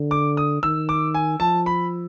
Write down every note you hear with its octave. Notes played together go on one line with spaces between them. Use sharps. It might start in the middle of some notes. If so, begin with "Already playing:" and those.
Already playing: D3
D6
D#6
D#3 E6
D6
G#5
F3 A5
B5